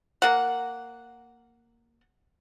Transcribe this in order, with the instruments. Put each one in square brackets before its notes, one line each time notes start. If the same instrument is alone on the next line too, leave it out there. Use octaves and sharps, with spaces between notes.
[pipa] A#3 F#5